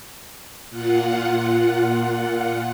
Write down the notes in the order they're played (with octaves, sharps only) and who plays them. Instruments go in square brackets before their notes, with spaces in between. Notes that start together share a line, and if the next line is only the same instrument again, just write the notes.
[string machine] A#2 F4 F#5